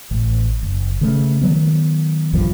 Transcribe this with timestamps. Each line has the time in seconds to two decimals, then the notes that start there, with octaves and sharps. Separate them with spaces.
0.11 A1
0.63 F#1
1.01 C#3 A3
1.41 D#3 F#3 B3
2.33 B1 G2 F3